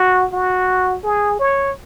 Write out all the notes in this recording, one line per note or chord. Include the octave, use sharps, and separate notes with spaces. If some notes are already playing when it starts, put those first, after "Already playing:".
Already playing: F#4
F#4
G#4
C#5